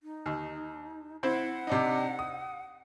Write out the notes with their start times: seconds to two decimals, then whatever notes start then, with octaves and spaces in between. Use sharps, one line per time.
0.03 D#4
0.26 D#2
1.23 C4 E4 C5 F#5
1.67 C3 D4 D#4
2.19 D#6